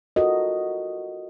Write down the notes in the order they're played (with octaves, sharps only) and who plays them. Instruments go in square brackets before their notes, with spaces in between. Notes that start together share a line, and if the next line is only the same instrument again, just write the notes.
[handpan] F4 F#4 A4 A#4 D#5